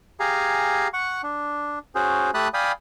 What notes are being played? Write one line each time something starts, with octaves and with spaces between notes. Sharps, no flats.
G4 G#4 F5 G#5 A#5
F#5 C#6
D4
C#4 F#4 G#4 C5
A3 G4 A5 B5 D#6 F#6
D5 F5 G5 G#5 B5 D#6